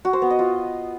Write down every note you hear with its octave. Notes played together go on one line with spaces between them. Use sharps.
F#4
C5
B3
D#5
F4